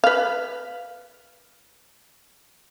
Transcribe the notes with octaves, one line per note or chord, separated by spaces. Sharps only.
B4 F5